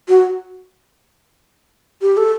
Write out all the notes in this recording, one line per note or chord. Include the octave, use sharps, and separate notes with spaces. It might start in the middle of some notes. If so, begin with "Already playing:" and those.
F#4
G4
A4